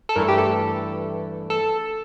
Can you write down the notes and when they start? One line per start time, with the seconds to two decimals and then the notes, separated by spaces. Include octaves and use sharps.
0.09 A4
0.16 G2 E3 A3 A#4
0.28 G4
0.38 A4
1.50 A4